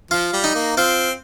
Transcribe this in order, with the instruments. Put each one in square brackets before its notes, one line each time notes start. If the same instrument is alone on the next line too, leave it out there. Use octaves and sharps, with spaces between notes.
[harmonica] F3 [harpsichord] F4
[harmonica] G3
[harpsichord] D#4
[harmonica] A#3
[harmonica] C4 [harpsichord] F4